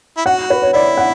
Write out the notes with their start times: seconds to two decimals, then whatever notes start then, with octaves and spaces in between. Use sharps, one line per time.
0.17 E4
0.26 F#4 F#5
0.50 B4
0.62 C#5
0.73 E4 D5
0.97 F#5